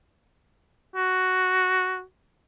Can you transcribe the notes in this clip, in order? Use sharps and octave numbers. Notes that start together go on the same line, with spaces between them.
F#4